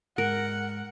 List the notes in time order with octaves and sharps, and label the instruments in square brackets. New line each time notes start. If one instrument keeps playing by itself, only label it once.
[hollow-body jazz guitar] G#2 [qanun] A#4 [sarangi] F#5